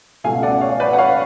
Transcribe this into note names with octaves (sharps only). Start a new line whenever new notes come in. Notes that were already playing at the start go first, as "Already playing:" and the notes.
C#2 B2 A3 F4 F5 G#5
D5 F#5
C#5 F5
B4 D5
F#5
C#5 F5